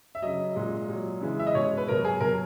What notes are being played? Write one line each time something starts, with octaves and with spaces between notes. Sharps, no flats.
E5
C#3 F#3 D#5
A#2 G#3
A#2 F#3
C#3 E3 G#3
E5
D#5
B2 G#3 C#5
B4
B2 F#3 A#4
G#4
B2 F#3 A#4